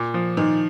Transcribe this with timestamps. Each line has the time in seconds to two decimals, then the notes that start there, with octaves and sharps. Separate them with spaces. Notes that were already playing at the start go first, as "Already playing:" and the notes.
Already playing: A#2
0.14 F3
0.37 A#2 D#3